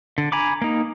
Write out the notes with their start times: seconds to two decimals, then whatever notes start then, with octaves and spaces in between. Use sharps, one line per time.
0.18 D3
0.32 G#5 A#5 B5 D6
0.62 A#3 D#4